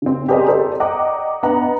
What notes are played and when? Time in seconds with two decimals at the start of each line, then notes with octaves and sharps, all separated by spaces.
0.02 C#3 C4
0.29 G4 G#4 A#4 C5 D5 D#5
0.48 A4 C5 D5
0.80 D5 D#5 F#5 G5 A#5 D6
1.43 B3 D4 B4 D#5 F#5 A#5